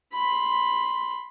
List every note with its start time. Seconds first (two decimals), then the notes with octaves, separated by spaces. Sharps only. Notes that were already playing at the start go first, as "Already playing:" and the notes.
0.13 B5 C6